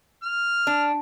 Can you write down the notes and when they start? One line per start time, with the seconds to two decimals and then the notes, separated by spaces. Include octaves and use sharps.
0.23 F6
0.67 D4